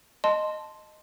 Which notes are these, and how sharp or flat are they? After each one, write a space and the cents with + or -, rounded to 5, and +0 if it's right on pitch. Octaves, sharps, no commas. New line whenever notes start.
D#5 -10 A5 +0 C6 +0